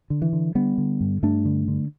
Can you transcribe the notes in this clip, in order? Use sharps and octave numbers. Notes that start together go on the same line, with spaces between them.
D3
E3
D3
D3 G3 B3
D3
G2
G2 A3 D4
D3
D3